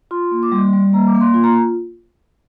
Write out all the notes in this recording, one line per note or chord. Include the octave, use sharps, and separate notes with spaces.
F4 C6
A#3
D6
G3 C6
G3
A#3 A#5
D6
A#3
C6
F4 C6
A#5